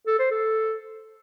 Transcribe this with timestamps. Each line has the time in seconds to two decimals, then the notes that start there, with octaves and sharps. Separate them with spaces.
0.07 A4
0.19 C5
0.31 A4